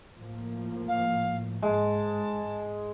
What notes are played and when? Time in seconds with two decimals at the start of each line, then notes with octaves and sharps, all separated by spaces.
0.16 A2 F3 A#3
0.88 F5
1.62 G#2 G#3 A5